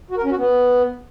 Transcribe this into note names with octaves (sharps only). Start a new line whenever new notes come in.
F#4
A#4
C#4
F#4
B3